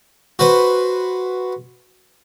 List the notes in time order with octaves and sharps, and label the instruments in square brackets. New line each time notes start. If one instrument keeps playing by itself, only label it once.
[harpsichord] F#4 B4 C5